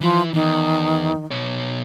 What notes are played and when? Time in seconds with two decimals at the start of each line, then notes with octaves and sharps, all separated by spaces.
0.01 E3 F3 E4
0.34 E2 D#3
1.31 B2 C#5